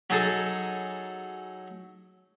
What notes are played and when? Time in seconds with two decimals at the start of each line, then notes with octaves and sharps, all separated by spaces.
0.10 F#3 D#4 G#4 A4